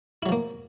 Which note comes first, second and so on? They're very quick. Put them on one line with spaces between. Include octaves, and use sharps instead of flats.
E4 F#3 F3 A#3